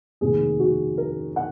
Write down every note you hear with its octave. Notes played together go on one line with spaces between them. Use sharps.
F1 D#2 D#3 G#4
F#4
A#4
F#5